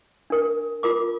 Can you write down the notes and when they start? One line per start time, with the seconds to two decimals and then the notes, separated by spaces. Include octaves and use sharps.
0.30 D4 A#4
0.83 F4 A#4 D6